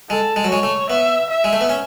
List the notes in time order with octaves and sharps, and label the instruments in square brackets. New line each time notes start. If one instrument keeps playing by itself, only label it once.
[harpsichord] G#3 [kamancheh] A4
[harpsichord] G#3
F#3
[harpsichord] G#3 [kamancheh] C#5
[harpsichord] A3
[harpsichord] B3 [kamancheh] E5
[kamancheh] E5
[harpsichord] G#3
A3
B3
C#4